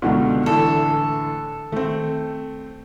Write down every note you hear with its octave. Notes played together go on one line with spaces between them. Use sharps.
C#2 B2 D3 G#3 D#4 F#4
A2 D3 E3 A3 A4
D#3 A3 C4